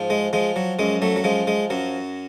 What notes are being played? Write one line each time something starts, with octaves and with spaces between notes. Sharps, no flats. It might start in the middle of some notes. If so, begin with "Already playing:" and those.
Already playing: G#2 F3
G#3
F3 G#3
F#3
F#2 G#3
F#3 A3
F#3
F3 G#3
G#3
F#2 F#3